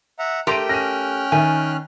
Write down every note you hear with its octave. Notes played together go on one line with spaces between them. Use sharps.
E5 F#5 A#5
A3 G4 A#4 G5 C6 D7 D#7
C#4 F6 F#6 A#6 D#7
D#3 E5 G#5